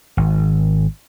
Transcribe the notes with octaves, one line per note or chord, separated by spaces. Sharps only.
G#1